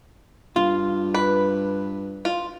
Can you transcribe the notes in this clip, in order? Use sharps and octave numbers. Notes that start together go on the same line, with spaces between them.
G2 F4
B4
F4